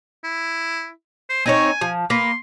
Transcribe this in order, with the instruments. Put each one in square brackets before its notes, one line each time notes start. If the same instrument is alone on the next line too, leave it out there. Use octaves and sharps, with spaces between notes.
[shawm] E4
C5
[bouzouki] C4 D#4 C#5 [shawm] G#5
[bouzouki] F3
[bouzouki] A#3 B4 [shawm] C6